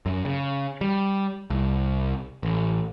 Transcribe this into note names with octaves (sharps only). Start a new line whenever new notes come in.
F#2
C#3
G3
C2
A1